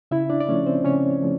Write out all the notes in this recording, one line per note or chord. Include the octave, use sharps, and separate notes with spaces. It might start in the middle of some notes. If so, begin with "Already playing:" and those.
C#3 E4 E5
D4 D5
D5
F3 A3 C#4 C#5
C4 C5
C#3 C#4 C#5
F3 A3